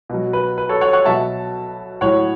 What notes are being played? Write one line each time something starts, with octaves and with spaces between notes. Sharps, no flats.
B2 F#3
B4
B4
A4 C#5
C#5 F#5
C#5 F#5
B2 F#3 E5 A5
A2 F#3 C#5 F#5